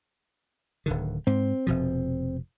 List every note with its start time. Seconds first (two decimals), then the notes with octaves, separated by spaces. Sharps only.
0.86 D1 D3 D#3
1.27 G#2 C4
1.67 F1 B2 F3